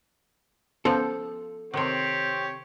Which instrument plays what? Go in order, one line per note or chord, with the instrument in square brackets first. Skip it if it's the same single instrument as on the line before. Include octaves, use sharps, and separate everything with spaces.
[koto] F3 [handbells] B3 C#4 C5 [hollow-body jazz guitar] A4
[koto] C3 D#3 [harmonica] C4 G4 C#5